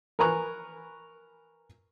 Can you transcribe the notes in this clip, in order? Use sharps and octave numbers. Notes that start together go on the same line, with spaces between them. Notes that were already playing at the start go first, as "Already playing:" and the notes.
A#4 B4 G#5 A#5 C#6 F#6